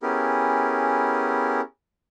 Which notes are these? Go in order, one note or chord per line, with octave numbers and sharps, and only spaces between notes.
B3 C#4 E4 G4 G#4 A#4